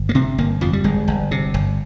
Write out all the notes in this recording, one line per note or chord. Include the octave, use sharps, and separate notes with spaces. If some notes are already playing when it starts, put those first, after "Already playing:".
Already playing: G1
A#3
C3 C4
G1 A#3
F2 F3
G3
G1 G#3
G1
C3
G1